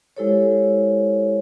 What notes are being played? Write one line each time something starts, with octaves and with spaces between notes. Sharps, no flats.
G#3 E4 G4 A4 C5 C#5